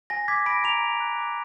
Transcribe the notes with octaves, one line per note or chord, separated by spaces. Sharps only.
G#5 A#6
D6 G#6 B6
B5 A#6 D7
A#5 D7 F7
A#5
F#6
D6